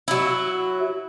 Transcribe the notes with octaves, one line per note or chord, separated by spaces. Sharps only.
F#3 E4